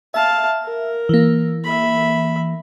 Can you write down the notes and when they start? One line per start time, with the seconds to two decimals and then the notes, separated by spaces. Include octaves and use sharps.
0.14 E5 F5 A5
0.63 A#4
1.09 E3 A#3
1.64 E5 B5